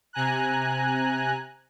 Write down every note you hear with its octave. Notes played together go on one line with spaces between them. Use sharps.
C3 G#5 A#5 F#6